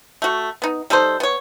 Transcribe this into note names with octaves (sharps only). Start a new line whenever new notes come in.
A3 F#4
B3 D#4
G3 D#4 A4 C5
B3 C#5